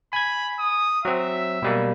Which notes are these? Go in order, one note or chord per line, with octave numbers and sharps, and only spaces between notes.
G#5 B5 G#6
D#6
F#3 C4 E5
B2 G3 A#3